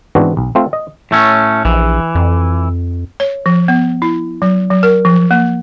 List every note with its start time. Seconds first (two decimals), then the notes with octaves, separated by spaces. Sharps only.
0.15 G#2 E3 B3 C4 D4 F#4
0.37 B1
0.55 A3 C4 F4
0.73 D#5
1.11 A2 A3 C#4
1.65 A#1 E3
2.15 F2
3.20 C#5
3.46 F3
3.68 B3
4.02 E4
4.42 F#3
4.71 F#3
4.83 A#4
5.05 F3
5.31 A#3